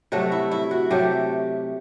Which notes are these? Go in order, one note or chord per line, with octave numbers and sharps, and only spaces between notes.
C3 F#3 A3 F#4
E4
E4
F#4
C3 F#3 A3 G4